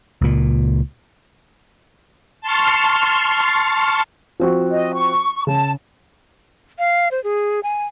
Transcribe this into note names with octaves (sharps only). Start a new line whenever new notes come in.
C#2 A#2
A5 C6 C#6 F6
F3 C4 F#4
D#5
C#6
C#3 A5
F5
C5
G#4
G#5